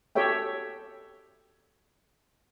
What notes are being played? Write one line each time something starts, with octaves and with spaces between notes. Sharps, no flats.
F#4 G4 A4 C#5 E5 G5